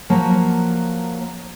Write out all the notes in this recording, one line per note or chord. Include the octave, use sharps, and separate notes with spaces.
F3 F#3 A#3